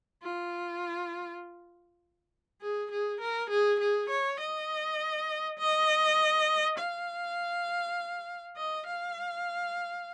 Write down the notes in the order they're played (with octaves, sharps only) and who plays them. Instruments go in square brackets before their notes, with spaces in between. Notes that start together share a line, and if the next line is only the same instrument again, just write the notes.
[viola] F4
G#4
G#4
A#4
G#4
G#4
C#5
D#5
D#5
F5
D#5
F5